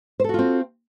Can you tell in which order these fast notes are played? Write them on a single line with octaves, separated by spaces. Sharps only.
C5 A4 F#4 F4 C4